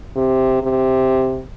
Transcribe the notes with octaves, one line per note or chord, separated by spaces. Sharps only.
C3
C3